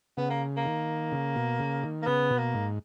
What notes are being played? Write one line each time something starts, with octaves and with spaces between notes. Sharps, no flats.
C#3 B3
A#3
A#3
D#3
C#3
B2
C#3
D#3
A#3
C#3 B3
B2
A#3
G#2